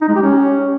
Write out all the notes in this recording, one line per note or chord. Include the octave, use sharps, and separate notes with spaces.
D#4
G#3
G4
C#4